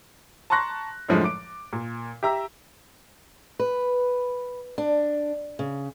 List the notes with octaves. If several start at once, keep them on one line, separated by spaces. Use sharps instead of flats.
A5 A#5 C6 C#6 F#6 A#6
F#2 A2 D3 F3 G#3 A3
D6 D7
A#2
G4 E5 A#5 E6
B4
D4
C#3